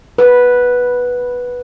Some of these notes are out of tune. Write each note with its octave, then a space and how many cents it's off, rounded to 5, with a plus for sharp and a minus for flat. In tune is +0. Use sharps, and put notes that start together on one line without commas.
B4 -5